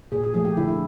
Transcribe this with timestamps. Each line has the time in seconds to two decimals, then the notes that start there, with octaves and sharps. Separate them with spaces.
0.12 A#2 G#4
0.24 G#4
0.34 F3 A3 G#4
0.45 G4
0.57 D3 E4
0.68 E4